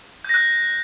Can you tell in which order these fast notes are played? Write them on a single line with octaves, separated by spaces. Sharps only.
G6 A#6 F#6